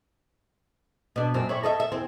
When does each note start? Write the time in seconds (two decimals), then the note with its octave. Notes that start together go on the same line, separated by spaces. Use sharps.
1.16 B2 D4
1.34 F#2 A#2 C4
1.49 E4 C#5 D5
1.63 A4 D#5 E5
1.80 E5
1.92 E2 C4